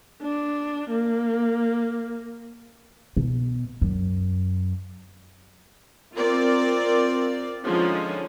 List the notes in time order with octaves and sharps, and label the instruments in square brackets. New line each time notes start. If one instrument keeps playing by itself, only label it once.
[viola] D4
A#3
[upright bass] B2
F#2
[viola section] C4 F4 A#4 D5
D3 F3 G#3 C#4 D#4